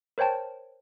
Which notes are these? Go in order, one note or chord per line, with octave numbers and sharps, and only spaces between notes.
A#4 C5 C#5 G5 A5